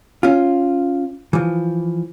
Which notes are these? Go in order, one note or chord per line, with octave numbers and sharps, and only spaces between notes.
C#4 F4
E3 F3